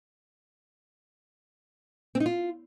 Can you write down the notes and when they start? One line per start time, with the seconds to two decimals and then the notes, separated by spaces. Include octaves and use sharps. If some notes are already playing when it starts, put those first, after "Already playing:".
2.15 C4
2.20 D#4
2.26 F4